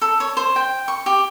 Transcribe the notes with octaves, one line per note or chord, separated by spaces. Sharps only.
A4
C#5
C5
G5
C#6
G4